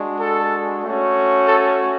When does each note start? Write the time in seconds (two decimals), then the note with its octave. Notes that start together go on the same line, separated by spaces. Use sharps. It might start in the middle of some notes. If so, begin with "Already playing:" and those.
Already playing: G#3 D4 F#4
0.20 A4
0.83 A3 C#4 F#4
1.48 A4